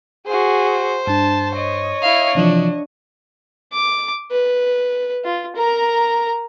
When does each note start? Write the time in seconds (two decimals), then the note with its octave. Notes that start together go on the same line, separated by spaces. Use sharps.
0.27 F#4 G#4 C5
1.07 G2 D4 A5
1.54 C#5 D#5
2.02 E4 F5
2.35 C3 E3 F3 D4
3.72 D6
4.31 B4
5.25 F4
5.56 A#4 A#5